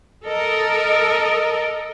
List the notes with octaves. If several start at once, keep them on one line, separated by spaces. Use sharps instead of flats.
A4 A#4 D#5